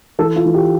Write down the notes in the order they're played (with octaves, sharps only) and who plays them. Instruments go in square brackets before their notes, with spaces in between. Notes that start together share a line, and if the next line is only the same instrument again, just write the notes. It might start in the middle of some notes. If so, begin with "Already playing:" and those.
[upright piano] E3 A4
F4
E3
G4